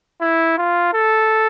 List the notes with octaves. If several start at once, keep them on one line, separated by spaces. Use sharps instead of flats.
E4
F4
A4